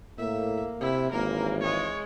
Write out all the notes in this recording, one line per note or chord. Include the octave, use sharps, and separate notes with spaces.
A2 A#3 E5
C3 E4
G#1 G2 C#3 E3 A#3 A#4
G#3 C#5